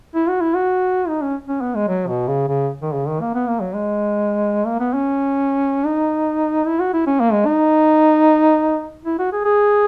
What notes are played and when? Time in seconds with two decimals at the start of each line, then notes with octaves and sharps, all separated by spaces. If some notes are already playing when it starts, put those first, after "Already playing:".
0.15 E4
0.28 F#4
0.41 E4
0.55 F#4
1.08 D#4
1.22 C#4
1.47 C#4
1.61 B3
1.75 G#3
1.88 F#3
2.07 B2
2.28 C#3
2.48 C#3
2.81 D#3
2.93 C#3
3.08 D#3
3.21 A#3
3.34 B3
3.47 A#3
3.60 F#3
3.74 G#3
4.66 A#3
4.80 B3
4.94 C#4
5.86 D#4
6.66 E4
6.80 F#4
6.93 E4
7.06 C#4
7.20 A#3
7.32 G#3
7.46 D#4
9.05 E4
9.19 F#4
9.32 G#4
9.45 G#4